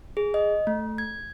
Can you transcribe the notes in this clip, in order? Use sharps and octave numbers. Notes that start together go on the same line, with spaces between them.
G#4
D#5
A3
G#6